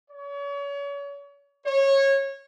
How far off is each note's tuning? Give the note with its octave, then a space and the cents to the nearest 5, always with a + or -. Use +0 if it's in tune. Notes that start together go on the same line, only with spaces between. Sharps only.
C#5 +35
C#5 -20